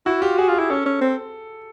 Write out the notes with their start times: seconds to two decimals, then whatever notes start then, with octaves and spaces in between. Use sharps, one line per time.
0.06 E4 F#4
0.22 F4 G4
0.37 F#4 G#4
0.48 F4
0.54 G#4
0.59 E4
0.70 C#4 A4
0.86 C#4
1.01 C4